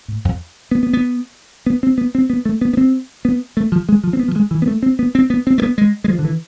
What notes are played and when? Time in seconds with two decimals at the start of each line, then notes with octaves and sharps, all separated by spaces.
0.08 A2
0.25 F2
0.71 B3
0.83 B3
0.93 B3
1.66 B3
1.83 C4
1.98 B3
2.15 C4
2.30 B3
2.45 A3
2.61 B3
2.73 B3
2.77 C4
3.25 B3
3.57 A3
3.72 F3
3.89 G#3
4.04 F3
4.13 C4
4.19 B3
4.28 F3
4.36 G#3
4.51 E3
4.62 B3
4.67 A3
4.83 C4
4.99 B3
5.15 C4
5.30 B3
5.47 C4
5.58 A3
5.62 B3
5.78 G#3
6.04 G#3
6.09 F3
6.19 D3
6.25 E3